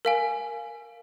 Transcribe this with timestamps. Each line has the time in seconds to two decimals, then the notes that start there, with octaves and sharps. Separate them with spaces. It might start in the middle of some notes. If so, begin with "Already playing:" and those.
0.05 A#4 F5 G#5